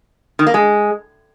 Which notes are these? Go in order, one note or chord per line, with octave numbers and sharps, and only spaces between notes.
D#3
A#3
G#3